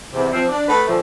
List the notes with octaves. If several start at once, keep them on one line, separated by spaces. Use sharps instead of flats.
E2 C3
F3 C4
D4
A3 B3 B4
A#2 D3 F3 A3